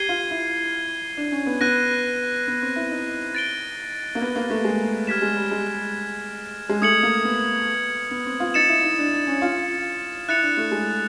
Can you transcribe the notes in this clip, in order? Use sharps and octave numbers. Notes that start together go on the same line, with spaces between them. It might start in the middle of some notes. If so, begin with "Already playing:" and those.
Already playing: G4 G#6 C7 D#7 G7
F4
E4
D4
C#4
B3
B3 F#6 A#6 D#7
B3
C4
E4
D#4
A6 D7 G7
A#3
B3
A#3
A3
G#3
G3 F6 G#6 B6 E7
G#3
G3
G#3
G#3
A3 D#6 G#6 C#7 F#7
A#3
B3
B3
C4
F4
D#4 A6 C#7 E7
E4
D#4
D4
D4
C#4
F4
E4 F#6 A6 C#7 F7
D4
A3
G#3